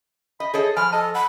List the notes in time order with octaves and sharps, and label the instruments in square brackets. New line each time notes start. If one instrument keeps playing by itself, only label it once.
[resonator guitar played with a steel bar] D#5 [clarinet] B5
[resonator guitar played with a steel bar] G#4 A4 D#5 [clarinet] C#5
[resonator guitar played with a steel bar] F3 [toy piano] G#5 [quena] B5 [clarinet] F6
[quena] A4 [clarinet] D#5 [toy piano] A5
[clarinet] F#5 [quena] B5